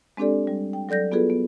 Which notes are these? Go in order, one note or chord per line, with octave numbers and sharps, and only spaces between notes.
G#3 C4 D4 G4 A4 D5
G3
G5
F#3 A4 D5 G6 A#6
B3 F4 F#4 G#4 A4 B4
B3